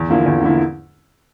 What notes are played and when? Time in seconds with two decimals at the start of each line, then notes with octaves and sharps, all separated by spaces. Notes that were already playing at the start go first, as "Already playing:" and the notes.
Already playing: E2
0.09 D3 F3 A#3 E4
0.26 E2
0.42 D3 F3 A#3 E4